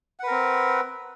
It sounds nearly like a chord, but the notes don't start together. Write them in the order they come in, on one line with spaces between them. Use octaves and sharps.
F#5 B4 A#4 C4